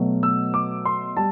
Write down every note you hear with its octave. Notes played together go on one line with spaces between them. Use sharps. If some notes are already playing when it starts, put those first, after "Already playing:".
Already playing: B2 F#3 A3
E6
D6
C6
G3 A5